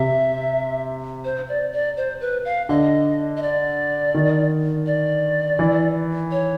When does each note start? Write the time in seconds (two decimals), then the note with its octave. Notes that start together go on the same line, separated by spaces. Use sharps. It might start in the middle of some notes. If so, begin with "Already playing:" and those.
Already playing: C3 E5
1.24 C5
1.49 D5
1.73 D5
1.97 C5
2.21 B4
2.45 F5
2.69 D3 D#5
3.37 D#5
3.42 D5
4.15 D#3
4.86 D5
5.59 E3
6.31 C#5